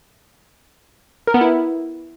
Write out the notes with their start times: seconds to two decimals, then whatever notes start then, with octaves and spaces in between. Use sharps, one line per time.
1.27 A#4
1.34 B3
1.41 E4